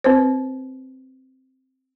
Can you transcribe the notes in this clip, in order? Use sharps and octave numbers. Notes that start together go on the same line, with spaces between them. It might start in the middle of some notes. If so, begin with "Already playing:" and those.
C4 B4 C5